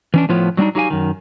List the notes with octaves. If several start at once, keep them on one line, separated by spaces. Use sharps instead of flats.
E3 C#4 D4
A2 F3 B3 F4 C#5
F#3 G3 B3 D4 D#4
F#3 D#4 G4 F5 G#5
F#2 D#3